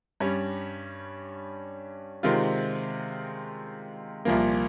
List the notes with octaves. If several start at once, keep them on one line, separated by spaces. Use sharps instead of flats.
G2 G3 C#4
C3 D#3 G#3 C4 F4
C2 A#2 F3 A#3